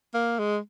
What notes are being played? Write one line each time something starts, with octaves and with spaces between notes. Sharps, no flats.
A#3
G#3